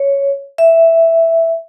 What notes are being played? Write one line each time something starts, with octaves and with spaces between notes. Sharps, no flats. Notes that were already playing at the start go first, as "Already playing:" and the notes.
Already playing: C#5
E5